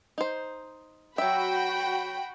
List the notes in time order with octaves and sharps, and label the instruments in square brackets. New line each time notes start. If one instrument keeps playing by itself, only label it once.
[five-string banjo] D#4 C5
[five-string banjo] F#3 E5 [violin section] F#4 G5 B5